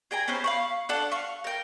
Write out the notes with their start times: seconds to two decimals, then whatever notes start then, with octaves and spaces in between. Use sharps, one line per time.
0.11 G#4 G5 G#5 A#5
0.28 B3 C#4 D#4 C5
0.44 F5 B5 C#6
0.89 D4 A4 F#5
1.12 F5 C#6
1.44 A#4 G5